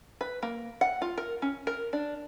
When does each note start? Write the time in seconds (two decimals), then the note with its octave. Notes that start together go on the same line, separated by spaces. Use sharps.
0.21 B4
0.43 A#3
0.81 F#5
1.02 F4
1.18 A#4
1.42 C#4
1.67 A#4
1.93 D4